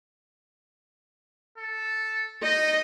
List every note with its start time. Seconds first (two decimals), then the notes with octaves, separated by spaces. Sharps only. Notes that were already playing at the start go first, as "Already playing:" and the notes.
1.58 A4
2.43 D#4 D#5